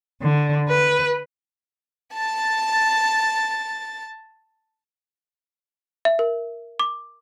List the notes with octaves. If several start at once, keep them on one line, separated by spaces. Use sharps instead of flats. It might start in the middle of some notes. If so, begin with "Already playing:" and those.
D3
B4
A5 A6
E5
A#4
D6